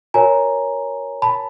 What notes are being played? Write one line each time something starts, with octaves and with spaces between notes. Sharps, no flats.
F#4 A#4 C#5 G#5 A#5
A5 B5